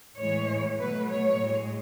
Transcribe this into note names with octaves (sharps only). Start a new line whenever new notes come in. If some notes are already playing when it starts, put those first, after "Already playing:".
A2 E3 G#3 C#5
B2 F#3 A3 B4
C#5
A2 G#3